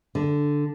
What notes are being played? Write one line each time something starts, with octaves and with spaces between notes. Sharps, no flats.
D3